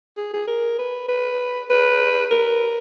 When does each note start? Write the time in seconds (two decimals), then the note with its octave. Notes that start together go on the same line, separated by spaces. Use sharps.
0.17 G#4
0.34 G#4
0.48 A#4
0.79 B4
1.09 B4
1.70 B4
2.31 A#4